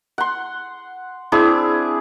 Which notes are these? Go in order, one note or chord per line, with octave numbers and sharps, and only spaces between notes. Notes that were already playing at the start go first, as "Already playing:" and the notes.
F#5 C6
C4 D4 E4 G#4